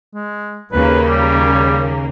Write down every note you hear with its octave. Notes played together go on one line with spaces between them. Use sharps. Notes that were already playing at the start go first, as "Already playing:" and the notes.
G#3
D#2 C#3 A#3 B4
G3